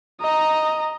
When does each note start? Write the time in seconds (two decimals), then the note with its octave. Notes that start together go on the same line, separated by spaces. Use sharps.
0.21 D#5 A#5